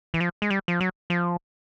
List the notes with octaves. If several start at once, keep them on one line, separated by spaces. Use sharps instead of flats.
E3
F3
G#3
G3
F3
F#3
F3